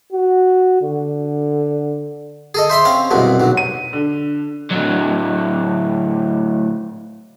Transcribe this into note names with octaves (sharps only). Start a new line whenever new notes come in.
F#4
D3
G#4 A4 D#5
C5 E5 B5 C6
C4 C#4 F5
C2 F#2 B2 G#3
B1 F#3
D#7
D3
A2 F#3